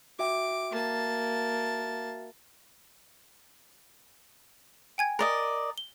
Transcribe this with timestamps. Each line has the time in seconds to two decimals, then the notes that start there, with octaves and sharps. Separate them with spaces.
0.19 F#4 E5 G5 D6
0.71 A#3 A5
4.98 G5 G#5 G#6
5.19 A#4 D5 D#5
5.78 G7